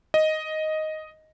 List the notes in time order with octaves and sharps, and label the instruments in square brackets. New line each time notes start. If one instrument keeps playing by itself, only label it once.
[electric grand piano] D#5